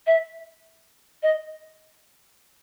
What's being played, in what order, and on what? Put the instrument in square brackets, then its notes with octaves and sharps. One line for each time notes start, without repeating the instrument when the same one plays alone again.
[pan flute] E5
D#5